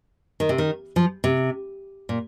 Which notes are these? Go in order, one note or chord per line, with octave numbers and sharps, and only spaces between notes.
D#3
C3
D#3
F3
C3
A#2